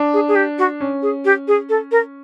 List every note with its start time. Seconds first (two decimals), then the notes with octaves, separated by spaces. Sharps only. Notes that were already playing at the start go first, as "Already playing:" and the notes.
Already playing: D4
0.13 G#4
0.28 G#4
0.35 G4
0.58 F#4
0.80 C#4
1.02 G#4
1.24 G4
1.47 G#4
1.69 A4
1.91 A#4